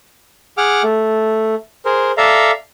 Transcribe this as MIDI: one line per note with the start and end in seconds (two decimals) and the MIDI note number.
0.58 0.82 68
0.58 0.82 78
0.58 0.82 86
0.58 0.82 89
0.83 1.55 57
1.85 2.12 68
1.85 2.12 70
1.85 2.12 72
2.17 2.51 69
2.17 2.51 74
2.17 2.51 76
2.17 2.51 77
2.17 2.51 82